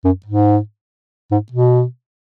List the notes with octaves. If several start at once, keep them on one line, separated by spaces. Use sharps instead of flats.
F#2
G#2
G#2
B2